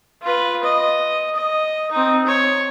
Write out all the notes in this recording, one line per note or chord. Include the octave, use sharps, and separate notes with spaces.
F4 B4
D#5
D#5
C4 D#4
C#5